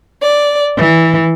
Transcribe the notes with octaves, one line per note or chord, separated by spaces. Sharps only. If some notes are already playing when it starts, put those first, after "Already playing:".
D5
E3